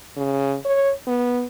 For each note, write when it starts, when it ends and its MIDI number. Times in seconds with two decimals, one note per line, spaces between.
0.17 0.56 49
0.65 0.91 73
1.07 1.46 59